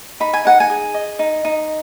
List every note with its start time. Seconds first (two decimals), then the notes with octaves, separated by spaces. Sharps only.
0.20 D#4 B5
0.33 G#5
0.45 D#4 F#5
0.60 G#5
0.70 G#4
0.94 D#5
1.19 D#4
1.45 D#4